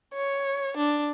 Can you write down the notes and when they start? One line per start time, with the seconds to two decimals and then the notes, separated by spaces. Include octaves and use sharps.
0.14 C#5
0.77 D4